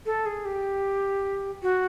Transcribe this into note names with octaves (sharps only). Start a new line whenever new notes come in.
A4
G#4
G4
F#4